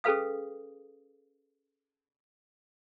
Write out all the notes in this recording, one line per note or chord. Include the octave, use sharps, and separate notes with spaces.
C#4 G#4 A4 B4 F5 D#6